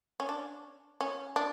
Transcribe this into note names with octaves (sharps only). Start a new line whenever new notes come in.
C#4
D4
C#4
D4